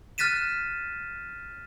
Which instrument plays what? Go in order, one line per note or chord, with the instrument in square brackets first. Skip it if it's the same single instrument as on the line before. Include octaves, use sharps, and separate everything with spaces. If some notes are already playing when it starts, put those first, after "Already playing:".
[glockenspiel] F6 F#6 A6 B6 D#7 E7